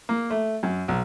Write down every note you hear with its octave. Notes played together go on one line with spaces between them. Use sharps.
A#3
A3
F#2
B1